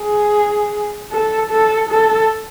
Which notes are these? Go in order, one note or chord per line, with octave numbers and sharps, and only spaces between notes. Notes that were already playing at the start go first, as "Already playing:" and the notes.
Already playing: G#4
A4
A4
A4